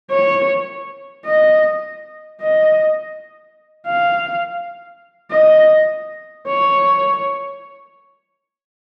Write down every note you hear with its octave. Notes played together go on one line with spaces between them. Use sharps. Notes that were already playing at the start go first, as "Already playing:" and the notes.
C#5
D#5
D#5
F5
D#5
C#5